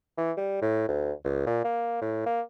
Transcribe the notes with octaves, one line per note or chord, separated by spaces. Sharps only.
E3
G3
A2
D2
C#2
A#2
A#3
A2
A#3